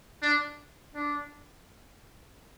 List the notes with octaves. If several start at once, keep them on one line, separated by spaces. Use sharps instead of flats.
D4
D4